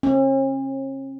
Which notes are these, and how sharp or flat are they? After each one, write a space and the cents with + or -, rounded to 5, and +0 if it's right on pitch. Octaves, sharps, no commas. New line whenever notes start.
C#4 -45